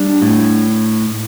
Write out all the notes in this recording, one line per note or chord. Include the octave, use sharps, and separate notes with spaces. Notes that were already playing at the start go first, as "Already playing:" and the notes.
Already playing: G3 D4
A2